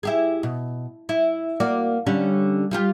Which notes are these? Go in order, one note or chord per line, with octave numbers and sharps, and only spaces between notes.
E4 G4 G#4
B2
E4
A#3 F#4 D5
D3 G3 C#4
G3 F4 G4